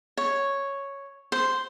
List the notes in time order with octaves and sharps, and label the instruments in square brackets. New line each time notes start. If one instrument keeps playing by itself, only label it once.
[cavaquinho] C#5
C5